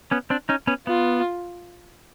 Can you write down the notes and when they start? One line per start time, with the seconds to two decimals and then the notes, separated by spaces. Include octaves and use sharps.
0.11 B3 C#4
0.30 C4 D4
0.49 C#4 D#4
0.67 B3 C#4
0.87 B3 F4